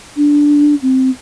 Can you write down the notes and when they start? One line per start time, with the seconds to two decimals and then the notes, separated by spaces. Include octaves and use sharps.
0.17 D4
0.82 C4